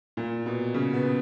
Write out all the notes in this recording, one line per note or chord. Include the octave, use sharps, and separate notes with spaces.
A#2
B2
C#3
B3